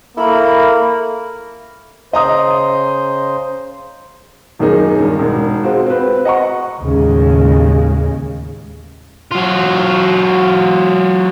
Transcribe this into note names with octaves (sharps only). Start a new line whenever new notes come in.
A#3 E4 A4 A#5 B5 C#6
C#3 C5 D#5 A#5 D#6
D#1 F#2 D#3 A#3 D#4 G#4
G2 D#3
E1 G#2
G#3 C4 F4 F#4
C4 B4
D#5 F#5 A#5 C#6
D#2 A2 C#3 G#3
F#3 F4